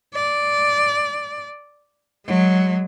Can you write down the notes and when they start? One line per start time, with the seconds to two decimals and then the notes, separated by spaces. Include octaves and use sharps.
0.14 D5
2.26 F#3 G#3